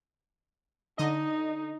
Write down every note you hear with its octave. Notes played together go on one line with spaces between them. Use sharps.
D3 D#4 D#5